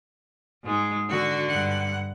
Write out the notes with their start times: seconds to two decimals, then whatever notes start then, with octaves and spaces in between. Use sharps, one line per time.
0.64 G#2 G#3
1.09 D3 F#4
1.50 G2 F#5